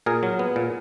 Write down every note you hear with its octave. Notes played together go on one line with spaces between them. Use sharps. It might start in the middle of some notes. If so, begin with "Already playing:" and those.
A#2 G#4 A#4
F#3
B3
A#2